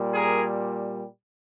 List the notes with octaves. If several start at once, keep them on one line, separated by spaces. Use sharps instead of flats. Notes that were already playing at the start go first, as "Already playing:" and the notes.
Already playing: A#2 G3
G#4 A#4